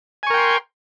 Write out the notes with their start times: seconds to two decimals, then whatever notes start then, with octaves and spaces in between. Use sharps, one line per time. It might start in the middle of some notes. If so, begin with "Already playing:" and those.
0.23 G#5
0.27 C#6
0.30 A#4
0.34 G5
0.37 C6